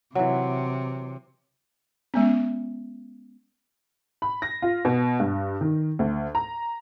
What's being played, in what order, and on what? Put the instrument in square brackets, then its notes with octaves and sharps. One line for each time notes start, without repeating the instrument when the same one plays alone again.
[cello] C3 [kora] E3 F#3
[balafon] G#3 B3 C#4
[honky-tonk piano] B5
A#6
F4
B2
G2
D#3
D2
A#5